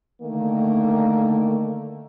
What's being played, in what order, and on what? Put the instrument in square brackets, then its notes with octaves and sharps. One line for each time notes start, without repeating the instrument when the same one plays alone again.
[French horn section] D3 D#3 A3 A#3